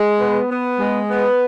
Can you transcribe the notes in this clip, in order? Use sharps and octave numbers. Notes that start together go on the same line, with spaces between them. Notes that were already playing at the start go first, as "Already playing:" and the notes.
Already playing: G#3
B3
B3
G#3
B3